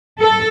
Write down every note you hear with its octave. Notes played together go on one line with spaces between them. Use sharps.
A4